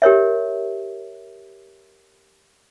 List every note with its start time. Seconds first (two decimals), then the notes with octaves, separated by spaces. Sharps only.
0.02 G4 A#4 C#5 E5